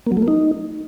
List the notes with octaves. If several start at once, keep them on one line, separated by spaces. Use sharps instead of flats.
A#3
F#3
A3
A#3
D#4